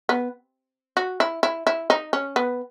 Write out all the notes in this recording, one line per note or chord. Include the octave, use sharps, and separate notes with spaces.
B3
F#4
E4
E4
E4
D#4
C#4
B3